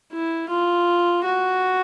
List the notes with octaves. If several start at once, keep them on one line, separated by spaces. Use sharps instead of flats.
E4
F4
F#4